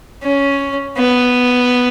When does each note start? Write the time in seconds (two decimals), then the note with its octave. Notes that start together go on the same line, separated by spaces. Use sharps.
0.23 C#4
0.97 B3